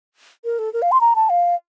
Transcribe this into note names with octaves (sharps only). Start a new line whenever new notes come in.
A#4
A4
A#4
F5
C6
A#5
A5
F5